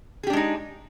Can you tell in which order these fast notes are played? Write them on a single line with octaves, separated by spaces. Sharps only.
G#4 G4 D4 G#3 D#4